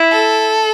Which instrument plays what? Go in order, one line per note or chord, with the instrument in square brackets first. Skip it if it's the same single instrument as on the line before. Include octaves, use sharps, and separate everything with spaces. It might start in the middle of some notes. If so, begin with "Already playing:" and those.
Already playing: [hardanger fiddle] E4
[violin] A4